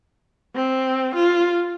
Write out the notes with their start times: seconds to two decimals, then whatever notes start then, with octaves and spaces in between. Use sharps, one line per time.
0.55 C4
1.15 F4